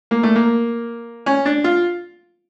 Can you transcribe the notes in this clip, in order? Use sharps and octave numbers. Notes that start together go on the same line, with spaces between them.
A#3
A3
A#3
C#4
D4
F4